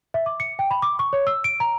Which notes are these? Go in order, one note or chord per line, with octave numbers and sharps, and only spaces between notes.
E5
D6
C#7
G5
B5
D6
C#6
C#5
E6
D7
A#5